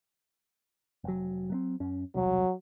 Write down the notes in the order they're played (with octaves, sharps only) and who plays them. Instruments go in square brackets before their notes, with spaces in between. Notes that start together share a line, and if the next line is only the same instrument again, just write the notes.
[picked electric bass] F1 F#3
F#3 A3 C4
F#2 C#4
[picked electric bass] E1 C2 [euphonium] F#3